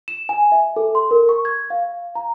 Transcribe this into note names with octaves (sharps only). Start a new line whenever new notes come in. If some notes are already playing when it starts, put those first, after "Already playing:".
E7
G#5
E5
A4
C6
A#4
C#6
G#6
F5
A#5